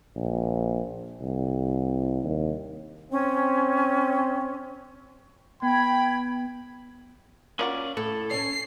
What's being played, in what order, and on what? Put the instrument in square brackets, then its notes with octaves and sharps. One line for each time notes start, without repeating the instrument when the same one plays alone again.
[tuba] A#1
C2
D#2
[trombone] C4 [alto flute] C#4
[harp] B3 [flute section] G5 G#6 [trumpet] B5
[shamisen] A#3 F4 F#4 [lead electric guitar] C#4 D5
[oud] A2 [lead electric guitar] A4
[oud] C#4 C#5 [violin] C7